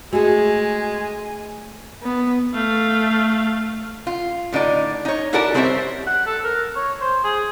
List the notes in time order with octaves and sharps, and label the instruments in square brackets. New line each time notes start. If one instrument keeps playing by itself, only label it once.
[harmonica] G#3 [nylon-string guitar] A3 G#4 [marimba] F#4 [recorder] G#5
[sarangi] B3
[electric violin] A3 F5
[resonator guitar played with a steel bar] F4
A2 D3 D#4 D5
D#4 C#5
E4 F#4 G4 A4 A#4 D5
G3 C4 C5 C#5 D#5 E5
[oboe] F#5
A4
A#4
C#5
C5
G#4